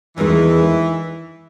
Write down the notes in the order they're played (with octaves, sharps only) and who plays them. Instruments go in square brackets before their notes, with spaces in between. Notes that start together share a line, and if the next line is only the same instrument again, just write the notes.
[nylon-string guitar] E2 D#3 G#3 D#4 [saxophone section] E3